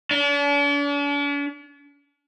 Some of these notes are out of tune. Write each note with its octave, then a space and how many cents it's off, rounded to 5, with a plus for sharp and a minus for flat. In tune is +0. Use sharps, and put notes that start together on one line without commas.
D4 -45